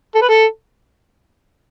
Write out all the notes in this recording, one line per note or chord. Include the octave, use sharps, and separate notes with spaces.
A4
B4
A4